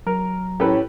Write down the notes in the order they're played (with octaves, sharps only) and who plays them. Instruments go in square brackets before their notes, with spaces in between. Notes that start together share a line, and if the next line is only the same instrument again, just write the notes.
[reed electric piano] F#3 A#5 [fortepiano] A#4
[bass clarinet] A2 [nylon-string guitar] C#4 C#5 [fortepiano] G4 A4 B4